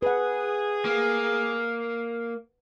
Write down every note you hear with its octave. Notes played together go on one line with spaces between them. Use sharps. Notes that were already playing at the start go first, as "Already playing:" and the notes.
G#4 B4 F#5
A#3